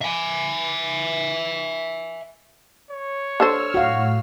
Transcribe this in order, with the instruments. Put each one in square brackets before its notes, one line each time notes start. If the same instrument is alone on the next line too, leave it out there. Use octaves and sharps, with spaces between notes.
[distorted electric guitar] E5 G#5
[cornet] C#5
[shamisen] D3 A4 C5 [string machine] E6 F6
[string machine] A2 [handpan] F#4 F5